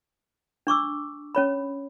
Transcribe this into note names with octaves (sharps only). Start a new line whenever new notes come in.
D4 C#6 D6 E6
C#4 C#5 B5